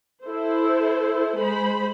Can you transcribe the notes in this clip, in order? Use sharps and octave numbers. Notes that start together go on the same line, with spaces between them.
E4 A4 C5
G#3 C5 B5